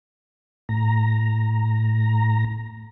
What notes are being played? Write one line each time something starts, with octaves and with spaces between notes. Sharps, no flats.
A2 A#5